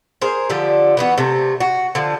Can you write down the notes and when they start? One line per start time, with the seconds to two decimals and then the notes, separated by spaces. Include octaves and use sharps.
0.21 G#4 A#4 C5
0.50 D3 F3 G4
0.97 E3 B3 F#4
1.18 C3 A3
1.60 F#4
1.95 D3 F3